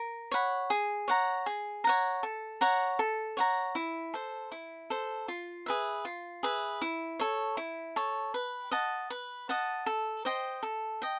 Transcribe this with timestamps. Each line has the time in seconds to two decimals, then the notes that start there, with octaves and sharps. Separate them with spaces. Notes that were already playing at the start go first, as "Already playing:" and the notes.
Already playing: A#4
0.31 C#5 F#5 B5
0.70 G#4
1.08 C#5 F#5 A#5
1.46 G#4
1.84 C#5 F#5 A#5
2.23 A4
2.61 C#5 F#5 A#5
2.99 A4
3.37 C#5 F#5 A#5
3.75 E4
4.14 A4 C5
4.52 E4
4.90 A4 C5
5.28 F4
5.66 G#4 B4 E5
6.05 F4
6.43 G#4 B4 E5
6.82 E4
7.19 A4 C#5
7.57 E4
7.96 A4 C#5
8.34 B4
8.71 D#5 F#5 A5
9.10 B4
9.49 D#5 F#5 A5
9.86 A4
10.25 C5 D#5 G5
10.63 A4
11.02 D#5 G5